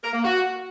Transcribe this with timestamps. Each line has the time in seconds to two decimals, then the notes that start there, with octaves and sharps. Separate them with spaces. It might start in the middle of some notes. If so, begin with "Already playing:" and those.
0.03 A#4
0.13 A#3
0.24 F#4